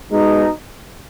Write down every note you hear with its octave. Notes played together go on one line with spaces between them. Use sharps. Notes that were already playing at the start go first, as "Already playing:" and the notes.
B2 G#3 D#4